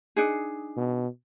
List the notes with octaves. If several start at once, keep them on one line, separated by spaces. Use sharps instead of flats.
D4 D#4 G#4
B2